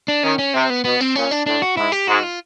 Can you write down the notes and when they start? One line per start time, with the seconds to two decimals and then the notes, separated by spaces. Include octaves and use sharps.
0.08 D4
0.23 D#3 C#4
0.39 C#4
0.54 C3 C4
0.70 B3
0.85 B2 B3
1.01 C4
1.15 A#2 C#4
1.31 D4
1.46 A2 D4
1.62 F#4
1.77 G#2 E4
1.92 G4
2.08 G#2 F#4
2.23 F4